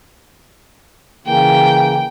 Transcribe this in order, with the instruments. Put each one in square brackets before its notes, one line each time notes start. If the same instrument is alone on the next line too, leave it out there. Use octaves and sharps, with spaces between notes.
[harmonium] C#3 E3 A#3 [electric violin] G5